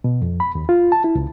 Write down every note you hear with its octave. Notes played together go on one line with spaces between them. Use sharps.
B2
F2
B5
D#2
F4
A5
E4
C#2